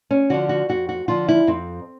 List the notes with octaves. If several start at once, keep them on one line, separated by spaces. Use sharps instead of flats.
C#4
D3 F3 F#4
F#4
F2 F#4
F#4
D3 F3 F4
E4
F2 C4